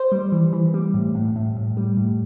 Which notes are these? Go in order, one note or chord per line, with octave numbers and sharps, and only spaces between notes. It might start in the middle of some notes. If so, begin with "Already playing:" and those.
Already playing: C5
G3
E3
E3
G3
A2
A2
A2
A2
G3
A2